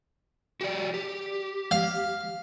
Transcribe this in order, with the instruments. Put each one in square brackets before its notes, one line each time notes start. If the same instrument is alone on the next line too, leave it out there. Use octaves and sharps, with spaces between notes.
[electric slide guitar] F#4 G4 D5
G4
[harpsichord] F5